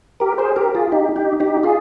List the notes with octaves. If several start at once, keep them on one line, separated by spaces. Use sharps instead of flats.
G4 A#4
G#4 C5
G4 A#4
F4 G#4
D#4 G4
D#4 G4
D#4 G4
F4 G#4